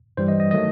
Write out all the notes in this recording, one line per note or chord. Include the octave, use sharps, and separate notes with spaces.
G2 E3 G3 C5
D#5
D#5
D#3 F#3 A3 D#5